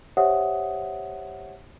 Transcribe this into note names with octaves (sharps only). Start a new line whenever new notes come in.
G4 C5 C#5 E5 F#5 D#6